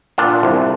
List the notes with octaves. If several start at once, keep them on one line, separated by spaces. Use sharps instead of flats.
A#2 D4 F4
C2